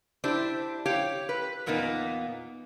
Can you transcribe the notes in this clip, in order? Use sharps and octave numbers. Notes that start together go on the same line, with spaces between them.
D4 E4 G4 C5
G4 C#5 F5
B4
E2 A#2 A#3 B3 D#4